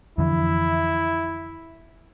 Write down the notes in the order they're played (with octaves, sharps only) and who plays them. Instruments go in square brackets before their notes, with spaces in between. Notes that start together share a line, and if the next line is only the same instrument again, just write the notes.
[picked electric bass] F2 D3 E3 [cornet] E4